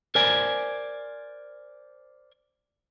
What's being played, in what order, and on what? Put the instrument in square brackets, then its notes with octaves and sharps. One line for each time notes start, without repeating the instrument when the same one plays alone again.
[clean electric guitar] A#4 C5 D5 G#5